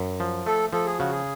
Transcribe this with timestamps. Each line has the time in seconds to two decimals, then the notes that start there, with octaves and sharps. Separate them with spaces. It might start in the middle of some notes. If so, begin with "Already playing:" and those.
Already playing: F#2
0.20 F3
0.46 A3 A4
0.73 F3 A4
0.86 G#4
0.98 C#3 F#4
1.11 G#4